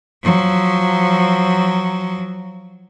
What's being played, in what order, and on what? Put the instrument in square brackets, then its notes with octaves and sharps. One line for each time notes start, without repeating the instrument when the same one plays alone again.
[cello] F3 F#3